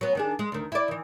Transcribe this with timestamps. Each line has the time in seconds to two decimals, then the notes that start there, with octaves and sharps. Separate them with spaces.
0.01 F#3 B3
0.15 D#3 D4 G#4
0.39 G#3
0.52 D2 D#3
0.72 E4 D5
0.88 D#3 E3